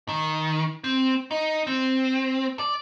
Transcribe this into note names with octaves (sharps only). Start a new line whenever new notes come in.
D#3
C4
D#4
C4
D5